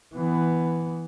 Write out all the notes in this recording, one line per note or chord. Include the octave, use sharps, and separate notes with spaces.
E3 B3